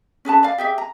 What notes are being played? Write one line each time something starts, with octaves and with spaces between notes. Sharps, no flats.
C#4 G#4 B4 A5
D5 F5
G4 G#4 E5
A#5